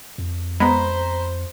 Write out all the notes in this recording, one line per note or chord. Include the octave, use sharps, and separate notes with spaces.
F2
G#3 B3 C5 A#5 B5